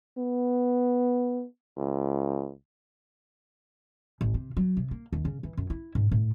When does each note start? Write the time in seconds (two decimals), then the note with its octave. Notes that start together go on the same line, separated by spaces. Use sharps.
0.18 B3
1.78 C#2
4.21 A1
4.34 C3
4.57 F#3
4.77 C3
4.91 A#3
5.13 D#2
5.25 C#3
5.43 E3
5.57 F#2
5.70 E4
5.95 G#2
6.11 A2